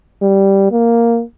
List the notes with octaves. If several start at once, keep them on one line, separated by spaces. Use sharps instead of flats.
G3
A#3